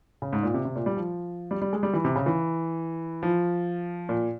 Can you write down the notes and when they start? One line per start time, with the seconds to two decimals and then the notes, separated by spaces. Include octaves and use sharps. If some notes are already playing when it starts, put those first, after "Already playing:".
0.22 C#3
0.33 G#2
0.43 A#2
0.54 C3
0.65 C3
0.76 A#2
0.86 G3
0.97 F3
1.51 G3
1.62 G3
1.73 G#3
1.83 G3
1.94 E3
2.05 C3
2.16 C#3
2.26 E3
3.23 F3
4.09 A#2